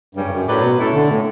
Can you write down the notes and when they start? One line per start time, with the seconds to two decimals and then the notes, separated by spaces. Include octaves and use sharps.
0.15 G2 C#3 G3 C#4
0.25 G2
0.30 F#2
0.46 A2 F#3 C#4 G4 B4 D5
0.61 B2
0.77 A3 C#4 E4
0.93 D3
1.09 A2